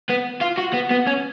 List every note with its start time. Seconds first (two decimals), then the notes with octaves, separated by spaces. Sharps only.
0.09 B3
0.41 F4
0.58 F#4
0.74 B3
0.91 B3
1.07 C#4